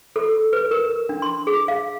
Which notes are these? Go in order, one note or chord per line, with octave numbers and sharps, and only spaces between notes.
A4
B4
A#4
D4
C6
G#4
F5